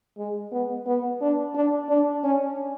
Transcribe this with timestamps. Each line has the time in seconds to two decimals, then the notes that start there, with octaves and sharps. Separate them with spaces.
0.18 G#3
0.52 B3
0.86 B3
1.21 D4
1.55 D4
1.89 D4
2.24 C#4